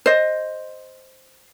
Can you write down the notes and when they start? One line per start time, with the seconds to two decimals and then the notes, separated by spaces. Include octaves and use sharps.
0.06 C5 D#5